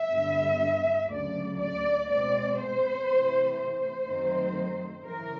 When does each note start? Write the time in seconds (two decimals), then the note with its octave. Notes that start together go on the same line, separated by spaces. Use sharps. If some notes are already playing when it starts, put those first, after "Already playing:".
Already playing: E5
0.10 G2 D3 G3 B3
1.09 D2 C#3 F#3 A3 D5
1.59 D5
2.08 B2 G#3 C4 D5
2.58 C5
3.08 C3 E3 A3 C4
3.57 C5
4.07 F#2 D#3 F#3 A3 C4
5.05 C#3 E3 A#4